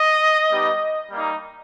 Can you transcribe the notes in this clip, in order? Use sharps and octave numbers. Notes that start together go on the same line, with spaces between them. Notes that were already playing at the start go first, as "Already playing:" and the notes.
Already playing: D#5
G3 B3 D#4 G4
G3 A#3 D#4